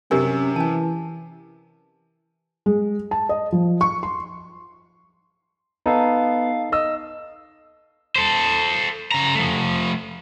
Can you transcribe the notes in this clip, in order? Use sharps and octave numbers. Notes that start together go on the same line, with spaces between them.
F#2 C3 C#4 G4 A#4 G#5
E3 G#5 A5
G#3
A5
D#5
F3
C#6
C6
B3 D#4 A4 F5
D#5 E6
A4 C5
C#3 A#5
F3 A3